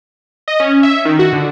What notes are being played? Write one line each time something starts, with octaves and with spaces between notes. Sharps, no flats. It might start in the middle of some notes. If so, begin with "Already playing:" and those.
D#5
C#4
E5
D#3
F#4
D3